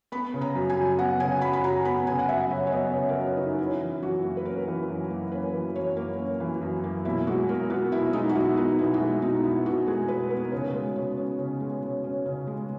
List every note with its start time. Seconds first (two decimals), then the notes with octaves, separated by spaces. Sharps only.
0.12 B3 B5
0.34 C#3
0.41 A#5
0.55 F#2
0.70 G#5
0.77 F#3
0.98 B3 F#5
1.20 C#3 G#5
1.42 F#2 B5
1.53 B5
1.64 F#3 A#5
1.85 B3 B5
2.07 C#3 G#5
2.19 F#5
2.29 F#2 E5
2.50 F#3 C#5
2.67 C#5
2.72 B3 D#5
2.93 C#3 C#5
3.09 A#4
3.15 F#2 B4
3.36 F#3 D#4
3.58 C#4 E4
3.80 E3
4.02 F#2 F#4
4.23 A#3
4.37 B4
4.45 C#4 A#4
4.68 E3
4.89 F#2
5.10 A#3
5.32 C#4 B4
5.53 E3
5.76 F#2 C#5
5.97 A#3
6.18 C#4
6.40 E3
6.62 F#2
6.84 A#3
7.05 B2 E4
7.27 G#3 F#4
7.49 B2 A#4
7.70 B3 F#4
7.92 B2 E4
8.13 G#3 D#4
8.29 F#4
8.35 B2 E4
8.56 B3 D#4
8.79 B2 E4
8.94 F#4
9.00 G#3 E4
9.22 B2 D#4
9.43 B3 E4
9.66 B2 F#4
9.87 G#3 G#4
10.08 B2 B4
10.30 B3 A#4
10.52 C#3 B4
10.73 G#3
10.96 C#3 C#5
11.17 C#4
11.38 C#3
11.60 G#3
11.82 C#3
12.04 C#4
12.26 C#3
12.47 G#3